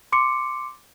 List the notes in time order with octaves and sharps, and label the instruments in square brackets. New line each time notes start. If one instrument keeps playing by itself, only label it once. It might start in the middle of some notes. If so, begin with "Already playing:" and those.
[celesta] C6 D6 C#7